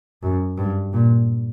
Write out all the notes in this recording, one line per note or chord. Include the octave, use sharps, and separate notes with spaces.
F#2
G2
A#2